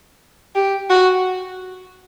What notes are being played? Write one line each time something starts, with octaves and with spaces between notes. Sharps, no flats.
G4
F#4